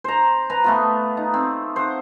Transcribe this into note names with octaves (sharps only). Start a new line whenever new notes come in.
C5 A#5
B4 A#5
A3 B3 F4
D#4
C4
C5 F#5